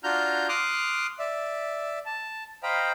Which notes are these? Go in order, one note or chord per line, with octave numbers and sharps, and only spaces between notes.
D4 F4 F#4 A#5 F6 G6
C6 D6 D#6 F6 F#6
D5 E5
A5
C5 D#5 F5 G5 A#5 B5